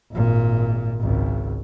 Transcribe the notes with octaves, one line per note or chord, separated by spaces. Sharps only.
G#1 A#2
G#1 C#2